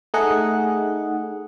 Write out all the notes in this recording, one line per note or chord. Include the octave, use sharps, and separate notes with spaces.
A3 D#4 G#4 D#5 F#5